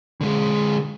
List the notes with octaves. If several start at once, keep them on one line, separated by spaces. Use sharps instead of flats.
D3 G#3